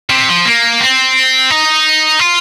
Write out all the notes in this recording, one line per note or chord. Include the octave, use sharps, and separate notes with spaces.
C3
F3
A#3
C4
D#4
F4